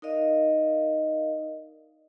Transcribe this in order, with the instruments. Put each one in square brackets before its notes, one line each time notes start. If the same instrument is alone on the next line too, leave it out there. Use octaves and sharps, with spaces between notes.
[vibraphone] D#4 A#4 D5 D#5 F5